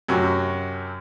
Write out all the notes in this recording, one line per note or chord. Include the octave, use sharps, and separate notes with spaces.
F#2 C3 F#4